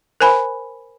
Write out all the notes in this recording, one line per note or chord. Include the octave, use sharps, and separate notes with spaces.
A#4 C5 G#5 B5